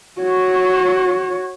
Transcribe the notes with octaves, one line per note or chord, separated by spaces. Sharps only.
F#4 C#5